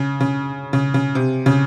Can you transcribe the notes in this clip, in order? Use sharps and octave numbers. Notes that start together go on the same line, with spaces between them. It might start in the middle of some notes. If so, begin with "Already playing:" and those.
Already playing: C#3
C#3
C#3
C#3
C3
C#3